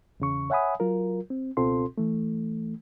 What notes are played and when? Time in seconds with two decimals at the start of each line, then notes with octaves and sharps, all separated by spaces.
0.20 E2 C#3 C#6
0.50 C#5 E5 F#5 G#5 B5 D#6
0.80 F#3 F4 A#4
1.30 C4
1.57 C#2 B2 C4 F4 A4 C6
1.98 E3 A3